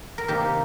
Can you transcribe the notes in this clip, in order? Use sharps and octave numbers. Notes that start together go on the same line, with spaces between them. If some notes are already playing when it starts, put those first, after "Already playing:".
A#4
C3 D#3 A#3 G4